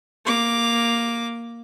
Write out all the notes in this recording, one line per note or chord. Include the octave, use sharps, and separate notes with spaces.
A#3 D6